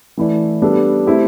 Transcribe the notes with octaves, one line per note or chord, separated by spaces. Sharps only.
E3 A3 E4 B4 D5
G3 B3 D4 A4
A3 C4 E4 G4